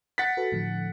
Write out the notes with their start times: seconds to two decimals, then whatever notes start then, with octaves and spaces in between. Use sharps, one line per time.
0.18 F#5 A6 B6
0.37 F#4 A4 B4
0.52 A2 D3 F3